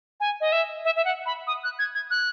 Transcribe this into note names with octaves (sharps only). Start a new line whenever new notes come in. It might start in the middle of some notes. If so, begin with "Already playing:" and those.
G#5
D#5
E5
E5
E5
F#5
B5
D#6
F#6
G#6
G#6
F#6